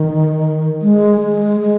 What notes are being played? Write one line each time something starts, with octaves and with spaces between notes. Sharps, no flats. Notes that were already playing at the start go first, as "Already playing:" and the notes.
Already playing: D#3
G#3
G#3
G#3